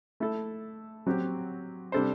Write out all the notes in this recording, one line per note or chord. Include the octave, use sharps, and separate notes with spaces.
A3 E4 A4
F#3 C4 G4
C3 G3 D4 A4 C5